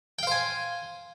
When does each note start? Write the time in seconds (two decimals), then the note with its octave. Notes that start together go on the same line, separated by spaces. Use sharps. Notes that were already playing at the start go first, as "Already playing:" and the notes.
0.19 G5
0.23 F5
0.27 C5
0.31 G#5